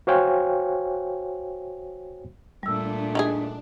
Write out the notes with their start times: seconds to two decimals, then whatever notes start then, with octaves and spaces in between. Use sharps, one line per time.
0.07 F#4 C5 C#5 F5 G5 G#5
2.63 A#2 G3 A3 D4 E6
3.15 D#3 E3 G#4